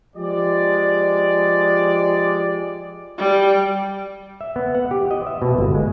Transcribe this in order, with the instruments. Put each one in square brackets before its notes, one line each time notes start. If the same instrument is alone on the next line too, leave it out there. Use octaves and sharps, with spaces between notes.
[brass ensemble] F3 G#3 G4 D5
[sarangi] G3
[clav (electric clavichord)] E5
B3
F#5
G4
D#5
E5
B2
G1
G#3